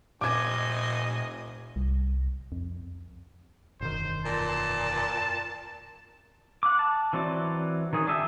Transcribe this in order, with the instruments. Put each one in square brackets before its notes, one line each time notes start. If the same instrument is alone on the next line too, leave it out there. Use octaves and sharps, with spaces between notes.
[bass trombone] F1 [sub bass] A#2 [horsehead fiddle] D#5 G#5 [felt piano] D6 G#6
[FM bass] C2
F2
[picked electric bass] E1 F#2 D#3 [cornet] C5
[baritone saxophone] A#2 [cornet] A5
[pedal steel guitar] F#5 D6
A5
E3 F#3 C4 F#4 D5
D#3 F#3 G#4
D4 G#4 E5 G5